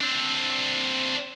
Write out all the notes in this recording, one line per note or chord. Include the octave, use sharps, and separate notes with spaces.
C4 D4